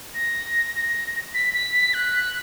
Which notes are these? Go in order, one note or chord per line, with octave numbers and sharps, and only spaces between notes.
A#6
B6
B6
B6
F#6